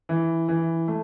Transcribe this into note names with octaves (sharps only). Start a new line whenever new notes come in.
E3
E3
A3